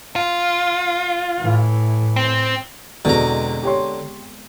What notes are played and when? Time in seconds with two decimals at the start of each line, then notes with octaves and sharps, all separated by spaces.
0.16 F4
1.40 A2 E3
2.16 C4
3.05 E2 B2 D3 G#3 B3 C4 A#5
3.63 G4 C#5 C6